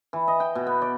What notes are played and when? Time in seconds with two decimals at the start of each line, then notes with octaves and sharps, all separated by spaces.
0.13 E3
0.28 D#5
0.40 G5
0.55 B2
0.67 B3
0.82 D5